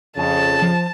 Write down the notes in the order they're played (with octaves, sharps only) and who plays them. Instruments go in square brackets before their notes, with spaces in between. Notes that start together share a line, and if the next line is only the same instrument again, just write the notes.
[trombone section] F2 C#3 [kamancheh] A5
[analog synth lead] F3